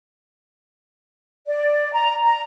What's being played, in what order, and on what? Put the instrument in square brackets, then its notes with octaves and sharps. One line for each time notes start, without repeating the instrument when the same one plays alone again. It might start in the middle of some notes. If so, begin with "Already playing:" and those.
[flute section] D5
A#5
A#5